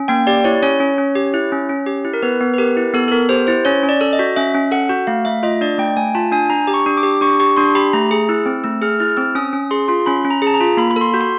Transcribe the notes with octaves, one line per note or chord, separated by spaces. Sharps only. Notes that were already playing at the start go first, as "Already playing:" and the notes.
Already playing: C#4
A#3 G5
G4 D5
E4 C#5
C#4 C#5
C#4
C#4
G4
E4
C#4
C#4
G4
E4
A#4
B3 B4
B3
B4
G4 A#4
E4
B3 A4
A4
B3 A#4
G4 C5
E4 C5
C#4 C#5
C#4
D5
A4
D#5
F#4
C#4 E5
C#4
A4 F#5
F#4
A3 F5
A3 E5
F4 D#5
D4 D5
A3 G5
A3 G#5
F4 A5
D4 G#5
D4 A#5
G4
C#6
D4
D6
G4
D4 C#6
G4 C#6
D4 C6
G4 B5
A3 A#5
G#4
E4 E6
C4
A3 E6
G#4 F6
E4 F6
C4 E6
C#4 D#6
C#4
G#4 C6
F4 C6
C#4 B5
C#4
A#5
G#4 A5
A#5
F4
A#3 B5
B5
A4 C6
F#4
C6